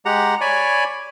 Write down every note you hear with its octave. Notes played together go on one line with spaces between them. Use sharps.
G#3 G4 F#5 A#5
C#5 D5 G#5 B5